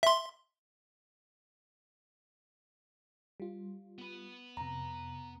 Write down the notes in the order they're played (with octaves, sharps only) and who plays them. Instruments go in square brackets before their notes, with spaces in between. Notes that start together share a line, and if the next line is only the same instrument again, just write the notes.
[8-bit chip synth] E5 C6
[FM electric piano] G3 F4
[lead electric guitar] B3 B4
[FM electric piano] F2 C3 [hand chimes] A#5